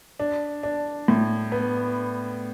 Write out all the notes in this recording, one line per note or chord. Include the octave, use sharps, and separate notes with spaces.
D4
D4
A2
B3